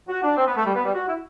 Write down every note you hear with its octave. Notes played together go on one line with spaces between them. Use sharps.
F#4
D4
C4
B3
A3
G3
B3
G3
F#4
E4